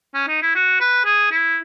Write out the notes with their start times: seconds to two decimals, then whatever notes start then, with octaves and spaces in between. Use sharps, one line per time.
0.15 C#4
0.28 D#4
0.42 E4
0.56 F#4
0.81 B4
1.06 G#4
1.31 E4